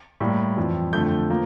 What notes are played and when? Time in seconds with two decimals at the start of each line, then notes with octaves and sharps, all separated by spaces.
0.20 A2 G3 A#3
0.57 F2 E3 G3
0.93 F2 D3 A3 G6
1.30 F3 A#3